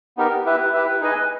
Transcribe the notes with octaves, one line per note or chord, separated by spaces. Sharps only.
B3 D#4 G4 A#4
E4 G4 B4 E5
E4 G4 B4 E5
D#4 G#4 B4 D#5 G#5